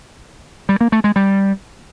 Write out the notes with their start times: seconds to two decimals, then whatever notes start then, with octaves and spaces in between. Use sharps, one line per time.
0.69 G3
0.81 A#3
0.92 A3
1.04 G#3
1.16 G3